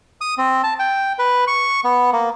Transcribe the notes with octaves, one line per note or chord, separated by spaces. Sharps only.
D#6
C4
A5
G5
B4
C#6
B3
A#3